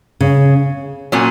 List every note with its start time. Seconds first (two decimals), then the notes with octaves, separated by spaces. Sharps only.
0.21 C#3
1.12 A#2 F#3 C#4